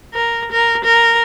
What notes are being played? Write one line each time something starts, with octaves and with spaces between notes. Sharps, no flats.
A#4
A#4
A#4